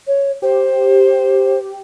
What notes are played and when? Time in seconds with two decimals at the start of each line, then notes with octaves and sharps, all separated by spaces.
0.07 C#5
0.42 G4 C5